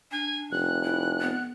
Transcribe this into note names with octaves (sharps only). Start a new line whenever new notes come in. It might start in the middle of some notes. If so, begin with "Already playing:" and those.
D4 G#5
F1 F#6
E4
B3